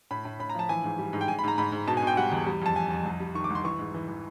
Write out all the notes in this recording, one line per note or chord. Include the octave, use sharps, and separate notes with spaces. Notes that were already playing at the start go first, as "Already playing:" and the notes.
A2 B5
A2
A2 B5
A#5
F3 A5
E3 G#5
G#2
G3
G#2
G5
G#2 G#5
B5
G#2 A#5
G#2 B5
G#2
B2 A5
G#5
B2 G5
G3 F#5
E2
G3
F2 A5
F2 G#5
F2
C2
G3
D#3 C#6
D6
C2
C6
E3 C#6
G#2
E3
E3